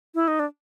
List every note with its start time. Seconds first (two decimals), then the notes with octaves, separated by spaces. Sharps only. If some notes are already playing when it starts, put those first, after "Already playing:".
0.15 E4
0.28 D#4
0.40 D4